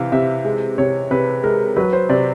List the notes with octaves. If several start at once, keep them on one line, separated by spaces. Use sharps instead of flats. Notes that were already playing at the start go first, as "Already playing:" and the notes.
Already playing: C3 E3 F5
C3 E5
G#3
C3 C#5
C3 B4
G#3 A#4
F#3 B4
C5
C3 D5